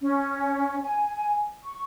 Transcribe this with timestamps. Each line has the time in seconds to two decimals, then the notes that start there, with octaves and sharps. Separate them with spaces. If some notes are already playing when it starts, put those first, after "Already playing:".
0.01 C#4
0.83 G#5
1.63 C#6